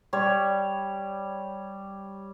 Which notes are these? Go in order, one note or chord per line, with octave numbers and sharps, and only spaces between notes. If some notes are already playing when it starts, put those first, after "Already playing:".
G3 C#5